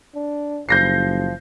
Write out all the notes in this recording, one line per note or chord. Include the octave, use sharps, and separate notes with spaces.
D4
F#1 F3 G6 A#6 C7